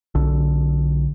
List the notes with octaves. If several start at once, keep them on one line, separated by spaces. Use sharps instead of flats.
B1 D3